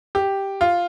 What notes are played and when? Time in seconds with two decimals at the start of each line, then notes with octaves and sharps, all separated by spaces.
0.15 G4
0.61 F4